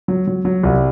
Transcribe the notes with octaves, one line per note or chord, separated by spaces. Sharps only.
F#3
F#3
F#3
C2